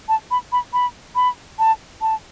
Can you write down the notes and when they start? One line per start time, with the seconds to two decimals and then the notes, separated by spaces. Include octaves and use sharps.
0.09 A5
0.31 B5
0.52 B5
0.73 B5
1.16 B5
1.59 A5
2.02 A5